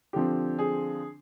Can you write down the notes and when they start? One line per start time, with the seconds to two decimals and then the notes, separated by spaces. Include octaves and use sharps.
0.13 D3 F3 C4 G4
0.59 G#4